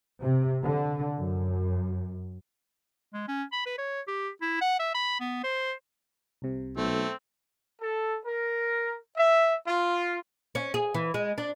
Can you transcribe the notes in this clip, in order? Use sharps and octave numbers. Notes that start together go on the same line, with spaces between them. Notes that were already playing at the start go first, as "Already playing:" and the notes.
C3
D3
F#2
G#3
C#4
B5
B4
C#5
G4
E4
F#5
E5
B5
B3
C5
C2 C3
B1 A3 C4
A4
A#4
E5
F4
C#4
G#4
E3
G#3
D4